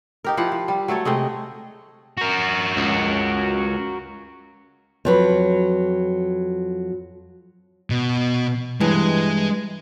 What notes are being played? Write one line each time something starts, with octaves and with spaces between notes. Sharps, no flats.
D#4 G4 A#4
F3 E4 G4 F#5
F3
G3
F#3 A3 A4 C#5
C3 G#3 A3 D#5
F#4 A#4
C#2
F2 F#3 B4
B2
G2 E3 G#3